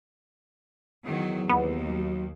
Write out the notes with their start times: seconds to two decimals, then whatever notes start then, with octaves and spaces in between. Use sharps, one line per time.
1.06 E2 D#3 F#3
1.49 D#2 B3
1.89 F#3